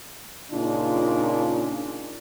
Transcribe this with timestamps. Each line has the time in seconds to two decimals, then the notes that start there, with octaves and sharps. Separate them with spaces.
0.52 A#2 C#3 A#3 D4 D#4 F4